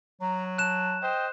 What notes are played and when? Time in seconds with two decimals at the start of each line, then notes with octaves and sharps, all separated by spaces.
0.21 F#3 A#5
0.58 A5 F#6 E7
1.02 C5 D#5 G5